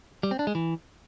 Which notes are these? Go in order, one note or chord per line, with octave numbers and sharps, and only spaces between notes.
G3
C4
D4
G#3
E3